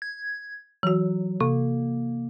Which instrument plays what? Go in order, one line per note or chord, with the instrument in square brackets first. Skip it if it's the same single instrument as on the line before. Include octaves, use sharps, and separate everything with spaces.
[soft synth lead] G#6
[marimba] E3 F#4 [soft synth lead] F#3
[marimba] C3 [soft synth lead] A#3